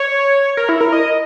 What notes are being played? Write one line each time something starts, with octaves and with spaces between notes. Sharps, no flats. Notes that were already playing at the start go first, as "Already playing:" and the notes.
Already playing: C#5
A#4
E4
A#4
D#5